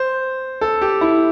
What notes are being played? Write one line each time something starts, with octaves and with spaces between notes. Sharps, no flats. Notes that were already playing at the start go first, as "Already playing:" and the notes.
Already playing: C5
A4
G4
E4